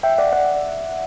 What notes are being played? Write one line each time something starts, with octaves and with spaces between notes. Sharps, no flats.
E5 G5
D5 F#5
D5 F#5